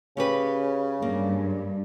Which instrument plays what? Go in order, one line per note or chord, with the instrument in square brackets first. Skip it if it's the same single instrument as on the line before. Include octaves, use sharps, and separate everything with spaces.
[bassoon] C#3 [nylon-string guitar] C#4 G4 B4
[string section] G2 [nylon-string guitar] A#3